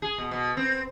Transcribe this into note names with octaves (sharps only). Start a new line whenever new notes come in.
G#4
B2
B2
C4